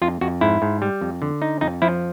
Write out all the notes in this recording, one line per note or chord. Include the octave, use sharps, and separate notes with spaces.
F2 F4
F2 F#4
G#2 E4
G#2
G3
F2
D3
D#4
F2 D#4
F3 E4